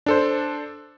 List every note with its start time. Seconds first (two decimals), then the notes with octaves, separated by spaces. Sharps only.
0.06 D4 A4 C5